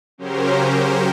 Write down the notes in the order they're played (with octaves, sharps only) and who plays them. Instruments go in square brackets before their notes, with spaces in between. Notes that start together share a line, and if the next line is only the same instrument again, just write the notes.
[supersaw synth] C#3 F#3 C#4 G4 A#4 C5